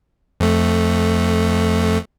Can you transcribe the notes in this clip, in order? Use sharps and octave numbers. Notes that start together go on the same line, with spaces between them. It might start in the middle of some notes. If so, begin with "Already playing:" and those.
F2 A3